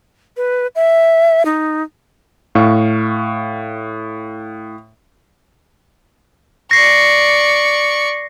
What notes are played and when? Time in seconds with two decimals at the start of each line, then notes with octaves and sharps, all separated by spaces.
0.37 B4
0.75 E5
1.45 D#4
2.55 A2 F5 C#6
6.71 D5 C#6 A#6 C7